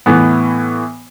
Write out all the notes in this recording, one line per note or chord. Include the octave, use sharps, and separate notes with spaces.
A2 E3 B3